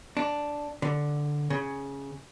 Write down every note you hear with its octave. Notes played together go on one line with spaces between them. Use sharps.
D4
D3
C#3